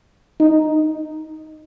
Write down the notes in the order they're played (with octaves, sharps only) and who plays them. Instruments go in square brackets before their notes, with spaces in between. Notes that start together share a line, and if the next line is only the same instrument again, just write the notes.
[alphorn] D#4